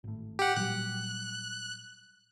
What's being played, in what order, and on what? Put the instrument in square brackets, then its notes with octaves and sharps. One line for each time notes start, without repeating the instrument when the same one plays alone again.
[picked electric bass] G#1 A2
[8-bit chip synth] G4 F#5
[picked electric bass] A#2 F#3 G3 [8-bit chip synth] F#6